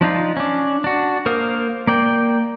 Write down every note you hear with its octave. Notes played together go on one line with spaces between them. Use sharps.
F3 D4 D#4 F4
C#4 D4
D4 F#4
A#3 A#4 C5 F5 D#6
A#3 D5 G5